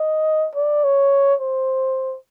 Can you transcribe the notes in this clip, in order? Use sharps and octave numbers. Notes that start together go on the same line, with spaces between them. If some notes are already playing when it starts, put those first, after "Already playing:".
Already playing: D#5
D5
C#5
C5